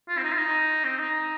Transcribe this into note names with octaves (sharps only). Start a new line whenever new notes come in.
F4
C4
D#4
F4
D#4
C4
D#4